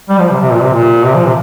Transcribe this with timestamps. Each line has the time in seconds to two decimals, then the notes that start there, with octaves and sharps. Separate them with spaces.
0.09 G3
0.20 F3
0.30 C3
0.41 C3
0.52 A#2
0.62 C3
0.73 A#2
1.04 C3
1.15 F3
1.26 C3